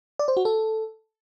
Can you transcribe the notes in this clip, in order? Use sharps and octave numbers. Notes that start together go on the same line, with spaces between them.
D5
C5
F#4
A4